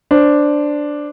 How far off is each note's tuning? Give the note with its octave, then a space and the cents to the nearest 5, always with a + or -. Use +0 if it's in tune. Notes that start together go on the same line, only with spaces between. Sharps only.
D4 +0 C5 +0